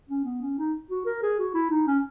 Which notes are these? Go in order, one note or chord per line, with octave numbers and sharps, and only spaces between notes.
C#4
B3
C#4
D#4
F#4
A#4
G#4
F#4
E4
D#4
C#4